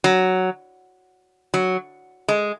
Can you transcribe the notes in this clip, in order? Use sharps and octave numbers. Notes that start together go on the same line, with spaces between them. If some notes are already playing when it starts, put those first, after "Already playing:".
F#3
F#3
G#3